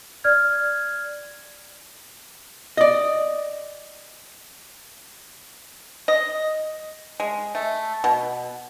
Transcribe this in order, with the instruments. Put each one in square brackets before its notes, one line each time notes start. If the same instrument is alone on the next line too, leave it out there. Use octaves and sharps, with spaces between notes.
[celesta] D5 F6 G#6
[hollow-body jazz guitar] D5 D#5
[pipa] D#5
G#3
A3
B2